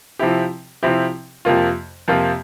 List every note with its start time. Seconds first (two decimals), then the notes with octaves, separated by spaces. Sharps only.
0.19 C3 F3 C4 E4 G4
0.83 C3 F3 C4 E4 G4
1.45 F2 C3 F3 A#3 F4
2.08 F2 C3 F3 A#3 F4